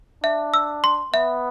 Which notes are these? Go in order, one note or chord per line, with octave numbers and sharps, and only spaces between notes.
D4 E5
E6
C6
B3 E5